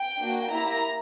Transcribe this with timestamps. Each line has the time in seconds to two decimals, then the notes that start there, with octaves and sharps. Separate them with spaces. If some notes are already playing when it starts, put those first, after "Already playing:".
Already playing: G5
0.20 A#3 D4 F#4
0.50 A#3 E4 G4 A#5